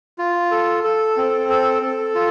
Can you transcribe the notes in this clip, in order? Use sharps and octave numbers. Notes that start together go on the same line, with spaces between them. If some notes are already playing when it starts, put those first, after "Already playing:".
F4
A4
A4
C4
A4
A4
F4